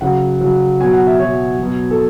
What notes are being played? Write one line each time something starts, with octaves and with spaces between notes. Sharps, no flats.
C#3 F#3 F#5
C#3 F#3
B2 F#3 G#5
F#5
E5
B2 F#3 C#5
B2 F#3
A4